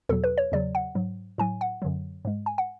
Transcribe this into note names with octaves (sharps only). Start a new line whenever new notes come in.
E2 B2 F#3 A4
B4
C#5
E2 C#3 F#3 D5
F#5
G#2 F#3
A2 F#3 G#5
F#5
F#2 D3 F#3
G#2 G#3
G#5
F#5